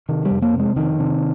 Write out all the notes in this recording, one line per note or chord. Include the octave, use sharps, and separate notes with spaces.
C3 D#3
G3
F2
A#3
C3
G#3
F2 D#3
C3